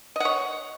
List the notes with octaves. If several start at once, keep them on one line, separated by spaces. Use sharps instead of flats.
C#5 D#5 F#5